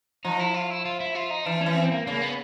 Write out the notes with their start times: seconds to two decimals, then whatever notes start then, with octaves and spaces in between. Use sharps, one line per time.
0.25 F3 D#4
0.39 E4
0.54 F4
0.70 E4
0.85 F4
1.00 E4
1.15 F4
1.31 D#4
1.46 E3 D4
1.61 E3 C#4
1.77 C4
1.92 A#3
2.07 C#3 A#3
2.22 B3